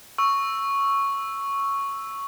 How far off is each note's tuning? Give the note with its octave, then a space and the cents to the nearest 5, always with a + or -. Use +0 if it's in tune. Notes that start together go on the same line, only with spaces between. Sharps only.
C#6 +0 E6 +0